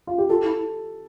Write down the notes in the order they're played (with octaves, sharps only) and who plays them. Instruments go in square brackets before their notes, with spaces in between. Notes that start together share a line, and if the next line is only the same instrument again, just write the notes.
[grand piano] F4
G4
[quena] F4 [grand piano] A4
[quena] E4